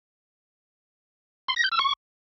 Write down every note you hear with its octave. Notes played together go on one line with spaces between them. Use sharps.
C6
A#6
G6
E6
C#6